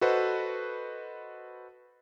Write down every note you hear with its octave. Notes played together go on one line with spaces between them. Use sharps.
F#4 A4 B4 C5 D#5 F#5